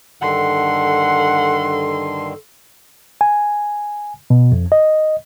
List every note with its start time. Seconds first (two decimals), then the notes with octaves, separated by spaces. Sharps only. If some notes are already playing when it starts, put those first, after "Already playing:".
0.22 G2 D3 D#3 A4 F#5 C6
3.21 G#5
4.30 B2
4.52 F2
4.72 D#5